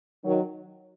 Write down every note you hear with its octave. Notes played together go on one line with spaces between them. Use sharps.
D#3 F#3